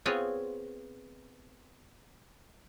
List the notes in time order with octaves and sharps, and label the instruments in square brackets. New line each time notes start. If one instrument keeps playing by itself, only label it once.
[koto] B3 C4 F4 G#4 C#5